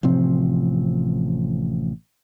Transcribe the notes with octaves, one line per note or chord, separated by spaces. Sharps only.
A1 C3 F3 C4